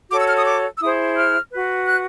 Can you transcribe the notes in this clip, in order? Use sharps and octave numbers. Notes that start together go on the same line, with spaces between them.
F#4 A4 C#5 D6
E6
F6
D#6
D6
E6
E4 G#4 C5 D#6
F6
F#4 B4
F#6